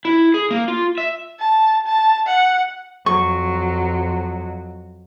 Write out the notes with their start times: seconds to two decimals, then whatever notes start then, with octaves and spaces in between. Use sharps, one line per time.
0.05 E4
0.34 G#4
0.51 A#3
0.68 F4
0.98 E5
1.40 A5
1.87 A5
2.27 F#5
3.06 F2 F#3 C#6